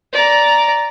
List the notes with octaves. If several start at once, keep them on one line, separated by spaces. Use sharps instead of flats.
D5 A#5